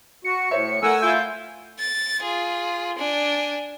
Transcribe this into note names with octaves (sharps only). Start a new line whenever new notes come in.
F#4 C#7
A2 C5 C#5 E5
A3 A#4 F#5 G#5 E6
E4 F4 G6
A6
F4 G#4
D4 G#5